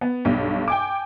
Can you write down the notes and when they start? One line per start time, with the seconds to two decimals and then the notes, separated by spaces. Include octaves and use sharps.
0.01 B3
0.25 B1 G2
0.68 G5 G#5 D6